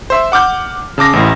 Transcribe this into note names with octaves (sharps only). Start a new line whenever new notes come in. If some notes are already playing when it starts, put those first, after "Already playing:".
C5 E5
F#5 D6 F6 G6
C#3 A5 D6 A#6
A1 A2